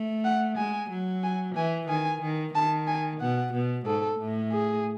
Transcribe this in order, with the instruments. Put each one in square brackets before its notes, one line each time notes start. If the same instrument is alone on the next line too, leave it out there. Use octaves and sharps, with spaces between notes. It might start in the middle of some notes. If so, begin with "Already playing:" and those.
Already playing: [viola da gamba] A3
[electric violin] F#5
[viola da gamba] G#3 [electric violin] G#5
[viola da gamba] F#3
[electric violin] G#5
[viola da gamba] E3 [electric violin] G#5
[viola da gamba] D#3 [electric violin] G#5
[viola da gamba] D#3
[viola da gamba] D#3 [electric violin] A5
[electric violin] G#5
[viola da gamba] B2 [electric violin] F#5
[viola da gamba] B2
[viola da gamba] G#2 [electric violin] A4
[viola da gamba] A2
[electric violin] G#4